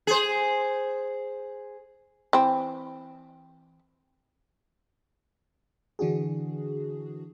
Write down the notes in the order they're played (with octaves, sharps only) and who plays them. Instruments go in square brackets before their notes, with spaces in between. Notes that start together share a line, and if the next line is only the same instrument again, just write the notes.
[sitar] G#4 C5
[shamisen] E3 C4
[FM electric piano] D3 E3 D4 F#4 G#4